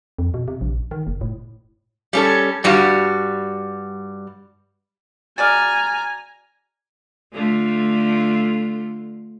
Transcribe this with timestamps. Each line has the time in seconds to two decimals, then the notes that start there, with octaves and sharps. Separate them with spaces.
0.19 F2
0.34 B2
0.48 C3
0.61 A#1
0.91 D#3
1.07 F#1
1.21 A2
2.13 G3 C#4 A4
2.64 G2 G3 F#4
5.38 F#4 G#4 D5 G#5 A#5 F6 A6
7.33 D3 A3 F4